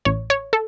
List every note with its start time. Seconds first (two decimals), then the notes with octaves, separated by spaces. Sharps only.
0.05 A1 C#5
0.30 C#5
0.53 A4